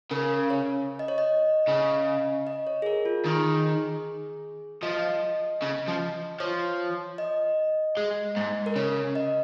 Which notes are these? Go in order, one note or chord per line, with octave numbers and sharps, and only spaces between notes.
C#3 A#4
C#5
D#5
C#5
D#5
C#3
D#5
C#5
G#4
A#4
F4
D#3 G#4
F3 D#5
C#3
F3
F3 C#5
D#5
G#3
G#2
A#4
C#3 C#5
D#5